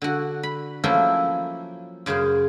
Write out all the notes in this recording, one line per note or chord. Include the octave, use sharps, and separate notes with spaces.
D3 F#4
B5
F3 F#3 A3 A#3 C#4 E4
F#2 C#3 G#4 C5 F5